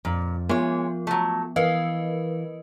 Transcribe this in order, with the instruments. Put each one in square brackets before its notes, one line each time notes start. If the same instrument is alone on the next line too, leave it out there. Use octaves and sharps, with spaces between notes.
[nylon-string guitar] F2 [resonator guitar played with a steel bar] A#2
[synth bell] F3 B3 [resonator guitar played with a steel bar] G#3 C#5 [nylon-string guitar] F4
[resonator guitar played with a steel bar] F#3 A3
[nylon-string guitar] E3 [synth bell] A#4 B4 D#5 [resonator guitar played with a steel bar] F5